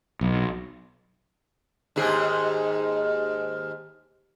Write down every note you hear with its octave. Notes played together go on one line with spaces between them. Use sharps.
B1
D#2 G#2 G#4